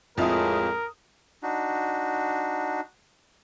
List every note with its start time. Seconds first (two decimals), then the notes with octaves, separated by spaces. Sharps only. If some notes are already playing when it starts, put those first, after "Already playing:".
0.18 F2 A2 G#3 E4 F4 A#4 F5 D#6
1.43 D4 D#4 F#4